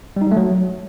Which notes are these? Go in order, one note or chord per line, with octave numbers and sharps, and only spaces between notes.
G3
D#4
G3
A3
F#3